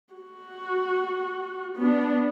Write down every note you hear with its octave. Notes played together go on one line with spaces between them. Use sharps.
F#4
B3 D4